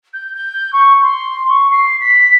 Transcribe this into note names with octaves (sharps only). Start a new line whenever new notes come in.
G6
G6
C#6
C6
C#6
C7
B6